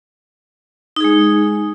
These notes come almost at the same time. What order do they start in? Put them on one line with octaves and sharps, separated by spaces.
D#4 G#4 G#3